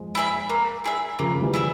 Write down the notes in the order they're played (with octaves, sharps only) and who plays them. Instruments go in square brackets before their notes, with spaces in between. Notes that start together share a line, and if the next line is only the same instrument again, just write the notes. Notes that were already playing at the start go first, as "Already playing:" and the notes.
Already playing: [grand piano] F3 G#3
[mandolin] E4 G#4 E5
A#3
E4 G#4 E5
[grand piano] C#3 F3 [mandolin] A#3
[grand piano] E3 G3
[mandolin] E4 G#4 E5